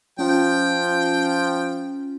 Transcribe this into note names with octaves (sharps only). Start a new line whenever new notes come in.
F3 C#4 F4 G5